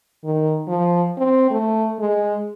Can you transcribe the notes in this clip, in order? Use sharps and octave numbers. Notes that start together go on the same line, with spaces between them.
D#3
F3
C4
A3
G#3